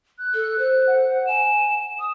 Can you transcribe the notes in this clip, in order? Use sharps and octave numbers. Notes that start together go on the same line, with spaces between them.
F#6
A4
C5 F#6
F#5
G#5 E7
D#6